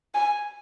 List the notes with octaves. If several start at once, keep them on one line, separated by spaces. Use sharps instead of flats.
G#5